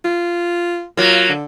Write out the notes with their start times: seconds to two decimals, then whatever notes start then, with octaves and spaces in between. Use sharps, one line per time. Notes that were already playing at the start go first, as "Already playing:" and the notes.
0.04 F4
0.97 F#3 A#3 F4
1.29 D3